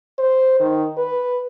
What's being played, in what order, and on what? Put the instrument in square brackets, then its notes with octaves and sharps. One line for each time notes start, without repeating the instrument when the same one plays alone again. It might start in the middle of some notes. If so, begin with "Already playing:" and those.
[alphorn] C5
D#3
B4